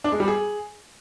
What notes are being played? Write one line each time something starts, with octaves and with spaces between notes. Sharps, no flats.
D4
G#3
G3
G#4